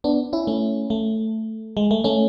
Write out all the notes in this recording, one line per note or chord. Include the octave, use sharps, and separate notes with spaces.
B3 D4
C#4 E4
A3 C#4
A3
G#3
A3
A3 C#4